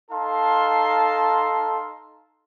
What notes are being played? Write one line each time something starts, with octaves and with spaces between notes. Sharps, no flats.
D#4 A4 F5 A5 A#5 C6